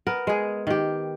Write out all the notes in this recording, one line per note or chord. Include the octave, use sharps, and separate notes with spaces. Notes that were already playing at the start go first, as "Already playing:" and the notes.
B3 A#4
G#3 G#4
D#3 G4